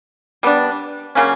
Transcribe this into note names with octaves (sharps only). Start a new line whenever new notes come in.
G3 B3 D4
C#3 F#3 A#3 C#4